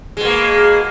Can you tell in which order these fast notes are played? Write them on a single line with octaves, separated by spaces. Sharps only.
G#3 B2 A#3